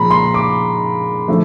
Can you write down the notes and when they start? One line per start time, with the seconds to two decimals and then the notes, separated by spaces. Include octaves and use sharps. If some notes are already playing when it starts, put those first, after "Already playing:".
Already playing: A#2 F3 G#3 A#5 B5
0.11 C6
0.34 D6
1.28 D3 F3 A3